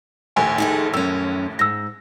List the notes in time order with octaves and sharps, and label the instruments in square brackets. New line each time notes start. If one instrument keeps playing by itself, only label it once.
[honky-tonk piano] A#1 D#2 A2 [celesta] G#5
[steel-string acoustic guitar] D#3 G#4 A4
[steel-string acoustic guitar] F#2 C#4 [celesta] E6
[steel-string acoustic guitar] G#2 [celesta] E6 A#6